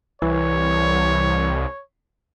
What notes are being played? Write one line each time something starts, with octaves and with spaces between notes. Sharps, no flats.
C2 E3 C#5